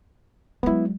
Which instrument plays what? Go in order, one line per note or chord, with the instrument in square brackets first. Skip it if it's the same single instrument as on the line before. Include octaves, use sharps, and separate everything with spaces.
[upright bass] F#3 G#3 [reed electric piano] B3 E4